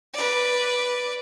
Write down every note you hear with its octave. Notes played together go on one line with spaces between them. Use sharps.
B4 D5